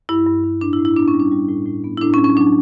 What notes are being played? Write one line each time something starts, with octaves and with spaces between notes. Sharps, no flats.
G2 E4
G2
G2
A2 D4
E4
A2
E4
B3 D4
C#4
G3
D4
G3
A2
A2
B3
E4
A2 D4
C#4
F#3
C#4
F#3 D4